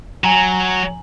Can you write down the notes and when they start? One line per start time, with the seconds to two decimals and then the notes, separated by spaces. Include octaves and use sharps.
0.24 F#3 G#5 A#5